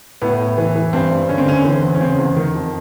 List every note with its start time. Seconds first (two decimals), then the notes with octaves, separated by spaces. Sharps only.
0.22 A2 B3
0.39 A2
0.58 E3
0.75 E3
0.93 G2 C4
1.11 G2
1.29 D3 C#4
1.38 C4
1.47 D3 C#4
1.65 E3 C4
1.83 E2
1.95 C#4
2.01 C#3 C4
2.19 E2
2.36 D#3
2.55 F2